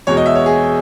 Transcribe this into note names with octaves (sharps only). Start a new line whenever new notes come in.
E2 B2 G#3 C#5
D#5
E5
C#5
G#4